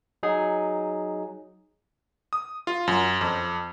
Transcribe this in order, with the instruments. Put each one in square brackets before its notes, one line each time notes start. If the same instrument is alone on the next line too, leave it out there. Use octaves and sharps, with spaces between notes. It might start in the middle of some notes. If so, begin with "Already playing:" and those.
[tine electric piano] F#3 D#4 G#4
[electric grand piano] D#6
F4
F#2
F2